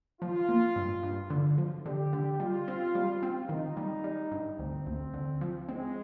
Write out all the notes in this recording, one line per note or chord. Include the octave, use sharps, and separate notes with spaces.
F3 F4
A#3
G2
G2
D3
F3
D3 G4
D3
G3 F4
C4
G3
C4
D#3 D#4
G3
G3
G2
D2 C4
D2
D3
F3
G#3 C4